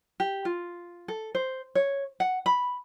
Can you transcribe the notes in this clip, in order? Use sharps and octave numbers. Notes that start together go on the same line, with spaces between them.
G4
F4
A4
C5
C#5
F#5
B5